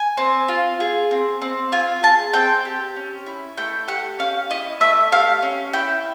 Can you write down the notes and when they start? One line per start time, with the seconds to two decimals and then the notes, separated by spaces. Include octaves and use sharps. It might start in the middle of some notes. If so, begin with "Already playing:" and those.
Already playing: G#5
0.17 C4
0.48 F4
0.80 G#4
1.11 C4
1.42 C4
1.72 F4 G#5
2.03 G#4 A5
2.33 C4 G5
2.65 G4
2.96 C#4
3.26 E4
3.57 A3 G5
3.88 G4 F#5
4.19 C#4 F5
4.50 E4 D#5
4.80 A3 E5
5.12 G4 F5
5.42 C#4
5.73 E4 G5